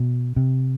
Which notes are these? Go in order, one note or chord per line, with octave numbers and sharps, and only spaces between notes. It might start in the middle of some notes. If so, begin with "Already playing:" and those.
Already playing: B2
C3